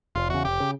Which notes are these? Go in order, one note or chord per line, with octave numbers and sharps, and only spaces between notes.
F1 F4
E2 C#3 F#4
F1 G4
C#3